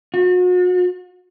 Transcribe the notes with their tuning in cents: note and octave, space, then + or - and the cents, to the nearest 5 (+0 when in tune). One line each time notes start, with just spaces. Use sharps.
F#4 -40